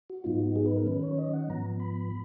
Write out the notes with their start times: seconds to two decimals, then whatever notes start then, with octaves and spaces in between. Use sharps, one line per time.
0.10 F#4
0.24 G#2 F#3 B3 D#4 F4
0.40 F#4
0.56 G#4
0.66 B4
0.76 A#4
0.86 D#3 F#3 C#4 B4
1.03 C#5
1.18 D#5
1.33 F#5
1.50 G#2 F3 B3 A#5
1.80 B5